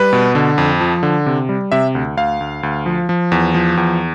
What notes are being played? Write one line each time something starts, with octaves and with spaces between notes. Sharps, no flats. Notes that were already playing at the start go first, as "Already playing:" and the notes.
Already playing: G3 B4
B2
D3
F2
F3
D3
C3
G3
C3 E5
D2
D2 F5
D2
D2
F3
F3
E2
F3
E2